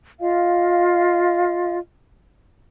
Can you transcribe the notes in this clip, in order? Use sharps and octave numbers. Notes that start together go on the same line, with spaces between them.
F4 D#5 F5